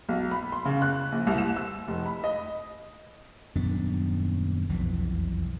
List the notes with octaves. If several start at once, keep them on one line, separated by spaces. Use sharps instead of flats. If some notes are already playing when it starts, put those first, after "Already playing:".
B1
B5
C6
C#3
F#6
A#1
C2
E7
E6
F1
B5
D#5
D#1 F#2 B3 D4
E1 B1 F2 E3